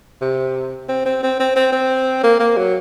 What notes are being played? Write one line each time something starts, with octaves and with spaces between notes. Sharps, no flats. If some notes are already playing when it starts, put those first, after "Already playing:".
C3
C4
C4
C4
C4
C4
C4
A#3
A#3
F#3